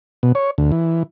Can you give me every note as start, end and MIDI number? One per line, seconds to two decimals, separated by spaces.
0.23 0.32 47
0.35 0.51 73
0.58 0.71 38
0.72 1.03 52